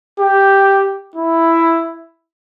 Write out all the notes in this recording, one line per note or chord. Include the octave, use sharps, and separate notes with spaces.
G4
E4